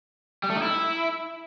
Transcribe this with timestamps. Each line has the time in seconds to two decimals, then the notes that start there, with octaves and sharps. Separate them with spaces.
0.43 G3
0.50 A3
0.56 D#4
0.62 E4